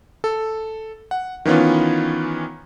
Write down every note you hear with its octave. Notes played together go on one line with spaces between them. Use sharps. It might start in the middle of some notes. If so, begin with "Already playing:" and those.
A4
F#5
D#3 E3 B3 C#4 F4